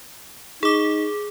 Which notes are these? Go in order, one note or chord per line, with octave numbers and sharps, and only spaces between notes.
D#4 G#4 D6